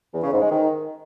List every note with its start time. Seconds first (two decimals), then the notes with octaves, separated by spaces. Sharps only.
0.14 E2
0.23 C#3
0.32 G#2
0.42 G#3
0.51 D#3